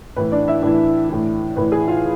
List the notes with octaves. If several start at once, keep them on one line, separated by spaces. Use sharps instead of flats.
A2 E3 B4
D4 D5
E4 E5
A2 E3 D4 D5
A2 E3
A2 E3 B4
G#4 G#5
F4 F5